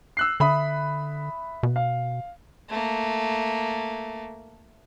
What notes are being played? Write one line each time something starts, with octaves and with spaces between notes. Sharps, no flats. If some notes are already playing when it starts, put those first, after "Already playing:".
E6 F#6 C7
D3 E5 B5 D#6
B2
F5
A3 A#3